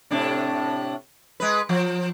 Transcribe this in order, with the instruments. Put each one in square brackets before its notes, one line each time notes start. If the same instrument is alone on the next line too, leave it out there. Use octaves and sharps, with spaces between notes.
[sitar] A2 C3 D4
G#3 B4
F3